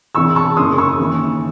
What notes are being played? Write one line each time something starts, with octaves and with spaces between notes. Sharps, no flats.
E1 E2 C3 E3 C#6 E6
A5 C#6
F#1 F#2 C#3 C6 D#6
C#6 E6
D#2 C#3 E3